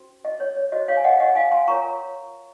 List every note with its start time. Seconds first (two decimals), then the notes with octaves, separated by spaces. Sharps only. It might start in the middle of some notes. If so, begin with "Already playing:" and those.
Already playing: C#4 F#4 C5
0.25 D#5
0.40 C#5
0.56 C#5
0.72 F#4 C5 D#5
0.88 C#5 F5
0.97 G#5
1.04 D#5 F#5
1.20 D#5 F#5
1.35 F5 G#5
1.51 G#5 C6
1.68 F4 A#4 C#5 A#5 C#6